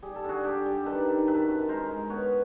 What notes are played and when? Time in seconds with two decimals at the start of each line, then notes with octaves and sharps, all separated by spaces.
0.02 G3 G#4
0.15 A4
0.24 D3 F#4 G#4
0.44 D3 G4 A4
0.65 G3
0.86 D#3 A4 B4
1.07 D#3
1.27 F#2 A4 B4
1.48 F#2
1.68 G#3 A#4 C5
1.89 G#3
2.10 B3 B4 C#5